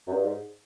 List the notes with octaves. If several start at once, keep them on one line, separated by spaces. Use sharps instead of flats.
F#2
G2
G#2